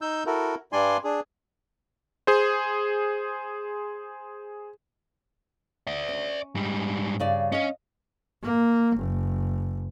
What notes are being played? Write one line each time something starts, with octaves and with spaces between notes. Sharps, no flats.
D#4 E6 G6
E4 F#4 A4 A#4
G2 G3 D4 D5 G#5 C6
D4 G#4
G#4 C5
D5 E5
C#4
G#2 G3
G2 C#3 D5
C#4 D#5 F5
A#3
F#1